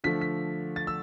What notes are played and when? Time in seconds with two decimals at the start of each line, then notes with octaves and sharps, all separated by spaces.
0.04 D3 F3 A3 B6
0.21 B6
0.76 A6
0.87 E6